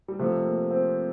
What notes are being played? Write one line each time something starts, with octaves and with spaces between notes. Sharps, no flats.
G3
C3 F3 A3
A#3
C4